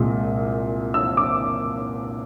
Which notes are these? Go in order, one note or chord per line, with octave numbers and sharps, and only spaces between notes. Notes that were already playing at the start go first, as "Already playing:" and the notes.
Already playing: C2 A#2 F3 G#3
E6
D6